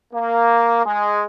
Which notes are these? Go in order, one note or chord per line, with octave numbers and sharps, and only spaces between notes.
A#3
G#3